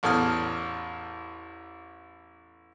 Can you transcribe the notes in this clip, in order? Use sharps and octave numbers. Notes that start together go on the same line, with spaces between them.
A1 E2 A4 D#6 F6